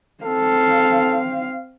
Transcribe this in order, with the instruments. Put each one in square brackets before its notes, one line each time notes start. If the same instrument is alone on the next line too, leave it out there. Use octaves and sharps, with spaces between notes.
[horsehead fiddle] C4 F5 [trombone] A4